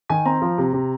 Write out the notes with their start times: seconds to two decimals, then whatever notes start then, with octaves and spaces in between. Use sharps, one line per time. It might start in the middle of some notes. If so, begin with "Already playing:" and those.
0.10 D#3 G#5
0.25 C4 A#5
0.42 F3
0.58 C3
0.73 C3